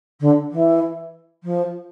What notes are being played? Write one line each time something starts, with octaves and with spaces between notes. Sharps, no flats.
D3
E3
F3